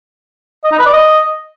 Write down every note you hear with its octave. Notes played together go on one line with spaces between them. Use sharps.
D#5
D#4
B4
D5
D#5